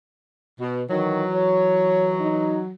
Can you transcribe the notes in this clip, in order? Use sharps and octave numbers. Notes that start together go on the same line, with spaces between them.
B2
D#3 E3 F#3
C#5
D#4